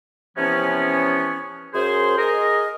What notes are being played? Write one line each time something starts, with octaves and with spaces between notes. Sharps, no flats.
C3 E3 F3 B3 C#4
F#2 G#4 C5
G#4 A#4 D#5